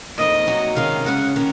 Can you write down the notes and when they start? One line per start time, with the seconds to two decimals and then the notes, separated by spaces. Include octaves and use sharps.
0.18 F2 D#3 A#3 D#5
0.47 C3 F#3 A#3 D#4 F#4
0.76 C3 D#3 G#3 C#4 F5
1.06 C#3 G#3 C#4 F#5
1.36 D#3 A#3 C#4